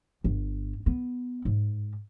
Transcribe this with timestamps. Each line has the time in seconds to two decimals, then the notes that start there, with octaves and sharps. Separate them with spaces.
0.24 G1
0.86 B3
1.45 G#2